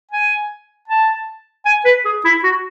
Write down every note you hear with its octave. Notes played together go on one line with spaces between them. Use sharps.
G#5
A5
G#5
B4
G#4
E4
F#4